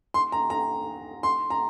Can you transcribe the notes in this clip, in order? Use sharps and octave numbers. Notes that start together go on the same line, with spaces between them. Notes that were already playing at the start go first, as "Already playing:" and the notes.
C6
A#5
A#5
C6
A#5